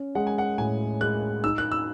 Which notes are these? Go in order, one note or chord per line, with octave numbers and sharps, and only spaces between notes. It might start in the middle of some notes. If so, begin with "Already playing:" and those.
Already playing: C#4
G#3 F#5
G#5
F#5
A2 G#5
G#3 F#6
D#4 E6
F#6
E6